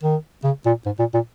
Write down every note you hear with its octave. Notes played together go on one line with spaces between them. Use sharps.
D#3
C#3
A#2
G#2
A#2
A#2